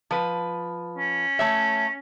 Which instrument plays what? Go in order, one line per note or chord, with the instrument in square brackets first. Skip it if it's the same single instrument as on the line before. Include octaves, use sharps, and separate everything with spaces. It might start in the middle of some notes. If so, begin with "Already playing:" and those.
[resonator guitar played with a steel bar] F3 B4
[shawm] C#4
[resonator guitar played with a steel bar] A3 C#5 E5